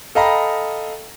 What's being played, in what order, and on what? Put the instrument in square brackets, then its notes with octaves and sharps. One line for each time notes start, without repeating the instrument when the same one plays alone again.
[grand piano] A4 D#5 F5 G5 A#5 B5